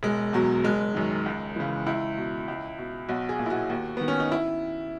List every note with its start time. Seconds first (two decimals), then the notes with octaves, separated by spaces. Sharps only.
0.03 E1 G#3
0.33 E2 B2 F#3
0.64 F#1 G#3
0.94 F#2 D#3
1.26 C#2
1.56 C#3 E3
1.86 C#2 E4
2.18 B2
2.48 C#2
2.78 B2
3.08 B1 F#4
3.29 G#4
3.39 A#2
3.46 E4
3.50 F#4
3.70 D#2
3.97 D#3 B3
4.08 C#4
4.20 D#4
4.32 E4